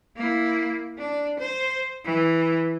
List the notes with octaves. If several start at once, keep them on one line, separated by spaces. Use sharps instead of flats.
A#3 E4
D4
C5
E3